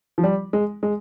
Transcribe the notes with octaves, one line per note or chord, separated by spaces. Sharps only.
F3
G3
G#3
G#3